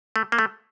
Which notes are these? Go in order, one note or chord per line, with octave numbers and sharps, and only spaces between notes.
A3
A#3
A3